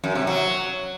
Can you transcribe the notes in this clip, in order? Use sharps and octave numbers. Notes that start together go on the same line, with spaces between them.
F#2
C3
F#3